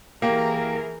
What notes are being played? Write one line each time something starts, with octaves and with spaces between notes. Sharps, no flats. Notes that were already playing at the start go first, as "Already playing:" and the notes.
E3 A#3 G4 G#4 A#4